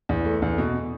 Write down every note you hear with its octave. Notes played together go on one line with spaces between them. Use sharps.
E2
A3
E2
B2